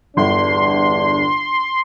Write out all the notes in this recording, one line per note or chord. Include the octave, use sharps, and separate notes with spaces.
G1 E2 G2 D4 C6